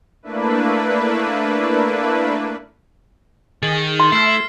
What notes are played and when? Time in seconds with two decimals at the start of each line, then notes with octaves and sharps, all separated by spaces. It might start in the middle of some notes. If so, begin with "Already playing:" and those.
0.23 A3 A#3 D4 E4 B4
3.63 D#3 G#4 A6
4.00 C6
4.12 A3 E4 F6 C7